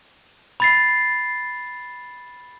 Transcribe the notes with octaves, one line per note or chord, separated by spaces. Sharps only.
B5 A6 C7